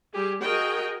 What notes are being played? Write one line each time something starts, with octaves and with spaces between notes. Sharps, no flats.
G3 G4 G#4
F#4 G#4 A#4 D#5 G5